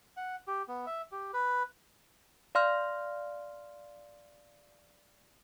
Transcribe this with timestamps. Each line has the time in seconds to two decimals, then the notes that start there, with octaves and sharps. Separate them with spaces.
0.17 F#5
0.47 G4
0.68 B3
0.86 E5
1.12 G4
1.34 B4
2.55 D5 F5 C6 F6